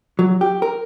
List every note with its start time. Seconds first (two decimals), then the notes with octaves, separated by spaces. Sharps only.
0.19 F#3
0.41 G4
0.62 A#4